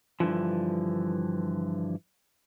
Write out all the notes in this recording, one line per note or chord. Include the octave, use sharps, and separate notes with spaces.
G2 D3 E3 F3